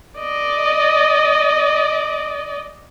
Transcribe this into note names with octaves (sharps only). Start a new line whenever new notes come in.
D5 D#5